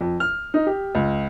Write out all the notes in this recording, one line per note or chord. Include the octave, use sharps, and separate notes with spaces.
F2
F6
D#4
G4
C#2